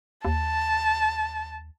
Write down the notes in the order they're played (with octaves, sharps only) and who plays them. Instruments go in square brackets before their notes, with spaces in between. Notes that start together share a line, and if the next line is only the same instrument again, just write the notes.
[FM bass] D#2 [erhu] A5